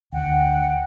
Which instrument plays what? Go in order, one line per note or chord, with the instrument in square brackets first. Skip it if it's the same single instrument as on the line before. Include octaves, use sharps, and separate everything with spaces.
[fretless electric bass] D2 D3 [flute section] F#5 G5